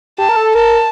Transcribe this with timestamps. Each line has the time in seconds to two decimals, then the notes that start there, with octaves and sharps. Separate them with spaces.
0.18 G4 A5
0.29 A#4
0.36 A4
0.55 A#4 A5